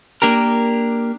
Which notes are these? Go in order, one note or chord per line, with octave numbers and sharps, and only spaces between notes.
A#3 D4 G4 A#4